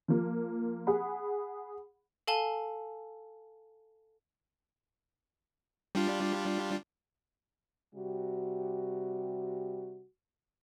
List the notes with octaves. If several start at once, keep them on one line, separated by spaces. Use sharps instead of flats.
F3 A#3
G#4 F#5 B5
A4 F5 G#5 A5 G7
G3 D4 F4
C3 G3 F#4